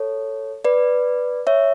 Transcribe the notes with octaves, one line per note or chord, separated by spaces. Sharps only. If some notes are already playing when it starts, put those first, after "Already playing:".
Already playing: A4 C#5
B4 D5
C#5 E5